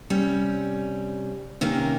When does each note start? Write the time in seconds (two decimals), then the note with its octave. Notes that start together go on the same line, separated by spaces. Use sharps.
0.10 C3 G3 C#4
1.61 C3 D#3 A#3 C#4